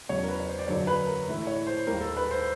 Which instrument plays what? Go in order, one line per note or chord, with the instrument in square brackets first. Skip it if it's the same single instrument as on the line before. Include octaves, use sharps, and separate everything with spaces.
[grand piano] E2 C#3 F#3 C#5
A#4
B4
C#5
C5
D5
F#2 D3 F#3 A#3 C#5
B4
A#4
A2 E3 A3
C#5
C5
D#2 D#3 G3 A#3 A#4
A4
B4
C5